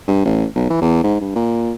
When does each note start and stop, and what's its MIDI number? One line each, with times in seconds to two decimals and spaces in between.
0.08 0.21 43
0.25 0.46 33
0.56 0.69 35
0.70 0.80 52
0.81 1.01 40
1.04 1.17 44
1.21 1.35 43
1.35 1.73 46